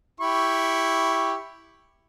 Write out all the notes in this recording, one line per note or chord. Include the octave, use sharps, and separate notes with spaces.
E4 G4 C#6